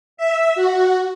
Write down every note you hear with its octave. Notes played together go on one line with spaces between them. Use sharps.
E5
F#4